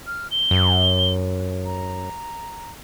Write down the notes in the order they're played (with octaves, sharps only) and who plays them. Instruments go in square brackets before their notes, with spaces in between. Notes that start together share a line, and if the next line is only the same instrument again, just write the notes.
[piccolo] F6
G7
[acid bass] F#2
[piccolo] A#5